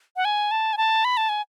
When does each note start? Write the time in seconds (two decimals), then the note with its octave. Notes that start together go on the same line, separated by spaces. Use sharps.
0.16 F#5
0.25 G#5
0.51 A5
0.73 G#5
0.77 A5
1.04 B5
1.17 A5
1.29 G#5